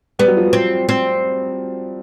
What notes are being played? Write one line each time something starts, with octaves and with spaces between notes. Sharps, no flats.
G3 B3
F#3
F3
F#3
C4
C4